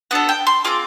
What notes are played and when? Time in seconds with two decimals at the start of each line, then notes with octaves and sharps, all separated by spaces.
0.11 B3 D4 F#4 A4 F#5
0.29 G5
0.47 C6
0.64 C4 F4 G#4 D6